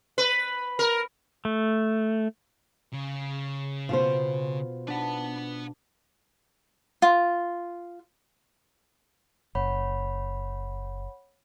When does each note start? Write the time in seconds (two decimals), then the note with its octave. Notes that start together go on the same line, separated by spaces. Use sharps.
0.18 B4
0.79 A#4
1.45 A3
2.93 C#3
3.89 B2 B3 F4 C5
4.88 D4 B4 F#5
7.02 F4
9.55 F#1 C#5 F#5 B5